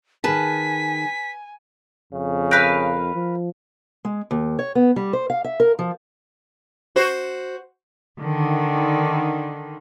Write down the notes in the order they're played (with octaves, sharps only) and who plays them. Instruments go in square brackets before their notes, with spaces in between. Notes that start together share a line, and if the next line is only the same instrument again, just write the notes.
[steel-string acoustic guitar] D#3 G#4 [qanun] B4 A5 [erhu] G#5 [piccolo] B6
[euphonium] F2 [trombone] C#3
[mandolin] A#4 B4 F5 [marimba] F#6 G6
[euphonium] F3
[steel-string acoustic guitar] G#3
D#2
C#5
B3
G3
C5
F5
E5
A#4
F3
[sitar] F#4 C5
[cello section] D3 D#3